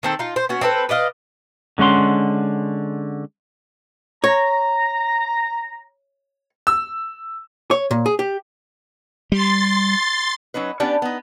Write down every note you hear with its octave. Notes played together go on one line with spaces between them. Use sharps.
D#3 C4 A4
D#4 F4
C5
B3 C#4 F#4
C4 D4 A4 B4
B4 D5 D#5 F5
D3 G#3 C#4 F#5 C6
C#5 A#5
E6
C#5
A#2
G#4
G4
G3 C6 A6
F#3 C#4 D#4 B4
B3 C#4 D4 G4 D5
B3 D#4